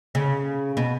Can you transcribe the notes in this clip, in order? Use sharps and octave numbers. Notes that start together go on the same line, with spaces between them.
C#3
B2